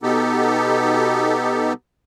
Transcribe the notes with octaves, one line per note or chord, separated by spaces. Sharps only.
B2 B3 D#4 G4 A4